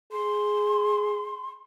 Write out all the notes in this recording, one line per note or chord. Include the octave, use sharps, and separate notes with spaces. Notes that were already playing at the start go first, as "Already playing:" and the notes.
G#4 C6